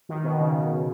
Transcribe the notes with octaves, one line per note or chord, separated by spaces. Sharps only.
D#3
B2
C#3